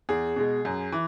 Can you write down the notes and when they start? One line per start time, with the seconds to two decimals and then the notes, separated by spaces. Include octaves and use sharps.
0.09 E2 G#4
0.36 B2 G#3
0.65 F#2
0.92 E3